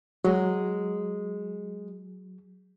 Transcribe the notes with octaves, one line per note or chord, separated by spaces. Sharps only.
F#3 G#3